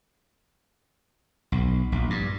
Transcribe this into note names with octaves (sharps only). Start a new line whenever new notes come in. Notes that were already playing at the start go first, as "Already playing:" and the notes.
B1
A#1
G2